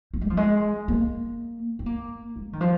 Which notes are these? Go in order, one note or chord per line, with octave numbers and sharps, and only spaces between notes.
A#3
G#3
F3
G#3
A#3
C4
A#3
G#3
D#3
F3